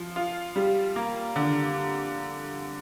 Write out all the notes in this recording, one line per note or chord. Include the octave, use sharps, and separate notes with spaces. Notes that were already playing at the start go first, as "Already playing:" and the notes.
Already playing: F3
F4
G3
A#3
D3